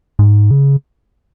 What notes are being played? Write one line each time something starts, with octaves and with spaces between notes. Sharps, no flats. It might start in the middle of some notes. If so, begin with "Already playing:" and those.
G#2
C#3